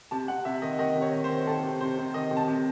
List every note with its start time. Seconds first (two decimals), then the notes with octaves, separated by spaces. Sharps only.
0.11 C3 A5
0.28 C3 F#5
0.45 C3 E5
0.62 D#3 D#5
0.79 D#3 D#5
0.95 C3
1.02 C#5
1.13 D#3
1.24 C5
1.30 D#3
1.47 D#3 A4
1.63 C3
1.81 C3 C5
1.98 C3
2.14 D#3 D#5
2.31 C3
2.37 A5
2.48 C3